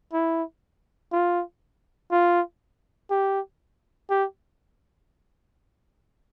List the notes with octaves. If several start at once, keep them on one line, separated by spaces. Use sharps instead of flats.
E4
F4
F4
G4
G4